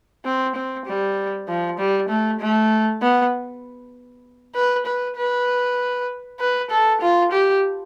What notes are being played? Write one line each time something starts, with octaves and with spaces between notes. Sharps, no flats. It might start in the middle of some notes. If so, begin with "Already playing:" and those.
C4
C4
G3
F3
G3
A3
A3
B3
B4
B4
B4
B4
A4
F4
G4